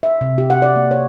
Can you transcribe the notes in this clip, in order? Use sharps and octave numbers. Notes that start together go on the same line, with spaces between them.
E5
C3
G4
F#5
D5
A#3
C#5